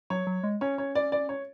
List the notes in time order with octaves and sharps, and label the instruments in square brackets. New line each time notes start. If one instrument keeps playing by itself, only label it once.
[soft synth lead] F#3 [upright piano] C#5
[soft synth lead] F#3
G#3
[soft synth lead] C#4 [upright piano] C#5
[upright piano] C#5
D5
D5
C#5